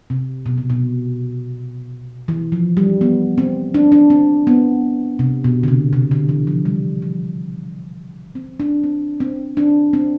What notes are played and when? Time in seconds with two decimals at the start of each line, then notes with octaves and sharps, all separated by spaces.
0.10 C3
0.46 B2
0.58 C3
0.70 B2
2.28 E3
2.52 F3
2.77 G3
3.01 B3
3.38 C4
3.74 D4
3.92 D4
4.10 C4
4.47 B3
5.19 C3
5.44 B2
5.63 D3
5.68 C3
5.93 C3
6.11 D3
6.29 E3
6.47 F3
6.65 G3
7.02 F3
8.35 C4
8.60 D4
8.84 C4
9.20 C4
9.57 D4
9.93 C4